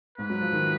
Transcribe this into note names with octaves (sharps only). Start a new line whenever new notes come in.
G#2 B4
F#3
F3
D#3